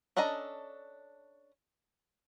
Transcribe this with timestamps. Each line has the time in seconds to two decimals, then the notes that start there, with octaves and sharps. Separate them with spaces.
0.17 C#4 D4 A4 D#5 A#5